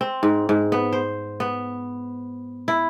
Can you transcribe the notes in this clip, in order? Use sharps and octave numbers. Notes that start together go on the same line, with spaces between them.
C4
G#2
G#2
B3
C5
B3
E4